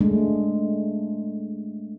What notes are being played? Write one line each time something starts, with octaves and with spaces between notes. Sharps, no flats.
G#3 A3 D4